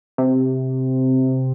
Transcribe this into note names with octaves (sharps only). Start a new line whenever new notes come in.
C3